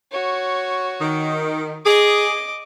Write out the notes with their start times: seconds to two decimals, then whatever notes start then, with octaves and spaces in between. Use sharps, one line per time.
0.12 F#4 C#5
1.01 D#3
1.86 G#4 D#5 D6